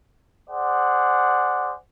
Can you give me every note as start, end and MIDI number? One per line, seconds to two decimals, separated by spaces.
0.50 1.75 68
0.50 1.75 72
0.50 1.75 74
0.50 1.75 78